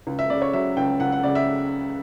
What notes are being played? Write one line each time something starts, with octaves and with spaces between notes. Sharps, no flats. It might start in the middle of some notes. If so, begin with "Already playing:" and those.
C#2
E5
C#3 D5
C#5
F#3 E5
C#2 G5
C#2 F#5
F#5
C#3 D5
E5